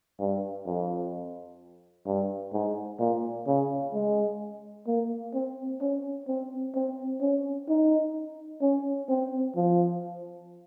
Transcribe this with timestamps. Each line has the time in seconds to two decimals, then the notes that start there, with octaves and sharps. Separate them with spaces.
0.20 G2
0.66 F2
2.06 G2
2.53 G#2
3.00 A#2
3.47 C#3
3.94 G#3
4.87 A#3
5.34 C4
5.81 C#4
6.28 C4
6.75 C4
7.21 C#4
7.68 D#4
8.61 C#4
9.09 C4
9.55 F3